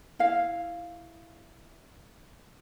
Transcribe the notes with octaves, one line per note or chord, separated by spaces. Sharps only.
E4 F5